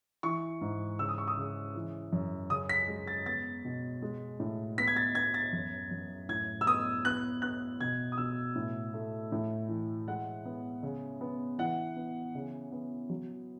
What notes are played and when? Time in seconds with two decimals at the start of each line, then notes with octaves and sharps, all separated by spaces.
0.23 E3 C#6
0.61 G#2
0.99 C#3 E6
1.09 D#6
1.18 C#6
1.28 D#6
1.37 C#3
1.75 E3
2.13 F#2
2.50 C#3 D#6
2.69 B6
2.88 G#3
3.07 A6
3.26 B3 A6
3.65 B2
4.02 G#3
4.40 A2
4.78 B3 B6
4.87 G#6
4.96 A6
5.15 B3 G#6
5.34 A6
5.53 F#2
5.91 F#2
6.29 A2 G#6
6.61 E6
6.66 B3 D#6
7.05 B3 F#6
7.42 B3 F#6
7.81 B2 G#6
8.12 D#6
8.17 B2 E6
8.55 A2
8.94 A3
9.32 A2
9.69 E3
10.08 G#3 F#5
10.45 B3
10.83 C#3
11.21 B3
11.58 E3 F#5
11.96 B3
12.35 C#3
12.72 B3
13.09 F#3